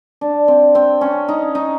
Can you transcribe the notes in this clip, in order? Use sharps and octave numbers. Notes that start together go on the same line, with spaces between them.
D4
C4
C4
C#4
D#4
D#4